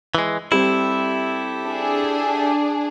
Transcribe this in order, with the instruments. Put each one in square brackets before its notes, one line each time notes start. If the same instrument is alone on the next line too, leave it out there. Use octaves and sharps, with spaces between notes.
[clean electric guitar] E3 G#3
[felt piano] G3 C4 C5 [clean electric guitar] E4 [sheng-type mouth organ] G4 A4 E5
[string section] D4 G#4